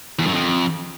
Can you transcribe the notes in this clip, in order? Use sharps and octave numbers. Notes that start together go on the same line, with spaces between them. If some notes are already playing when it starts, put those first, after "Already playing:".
E2
F#2
F2